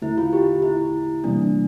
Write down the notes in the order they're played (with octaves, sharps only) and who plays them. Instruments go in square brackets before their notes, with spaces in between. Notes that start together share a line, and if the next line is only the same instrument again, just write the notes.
[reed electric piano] E2 D3 A3 [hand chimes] E4
[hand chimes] F4
G4
E4
[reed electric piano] C3 E3 G3 A#3 [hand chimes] D4